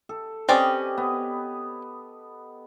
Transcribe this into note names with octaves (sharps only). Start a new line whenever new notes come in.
A4
C4 C#4 G4 B4 D5 D#5
B3